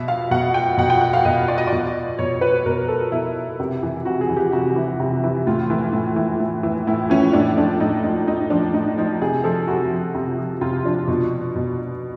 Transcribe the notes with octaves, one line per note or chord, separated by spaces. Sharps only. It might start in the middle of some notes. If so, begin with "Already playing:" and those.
Already playing: B2 E5
F5
B2 F#5
G5
B2 F#5
G5
F#5
F5
B2 D#5
D5
D#5
D5
B2
B2 C#5
B4
B2 A#4
A4
B2 E4
C3
E3
C3 F#4
G#4
E3
G4
C3 F#4
E3
C3
E3
A2 F4
E3
A2
E3
A2
E3
A2 E4
E3 C#4
A2 D4
F3 D4
A2 D#4
F3 D#4
A2 D#4
F3 D4
A2 D#4
F3 D#4
C3 G#4
F3 A4
C3 F#4
F3
C3
F3
C3 F4
F3 D4
B2
B2